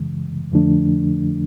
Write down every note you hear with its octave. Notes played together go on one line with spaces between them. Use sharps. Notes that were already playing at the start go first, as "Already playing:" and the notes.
Already playing: F#2 C#3 E3 G#3
F2 D3 F3 A3 D4